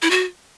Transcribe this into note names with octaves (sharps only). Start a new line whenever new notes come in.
E4
F#4